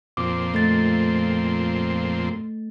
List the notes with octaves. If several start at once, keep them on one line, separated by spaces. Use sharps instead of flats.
F2 A#2 C4 D6
A3 A6